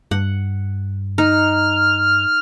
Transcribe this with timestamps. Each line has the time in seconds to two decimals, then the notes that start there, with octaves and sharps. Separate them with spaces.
0.11 G2 F#5
1.18 D#4 F6